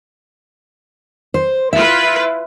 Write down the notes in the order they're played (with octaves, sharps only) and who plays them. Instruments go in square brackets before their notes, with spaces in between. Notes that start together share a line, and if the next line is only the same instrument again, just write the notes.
[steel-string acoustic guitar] C5
[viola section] E4 F4 B4 [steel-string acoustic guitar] E5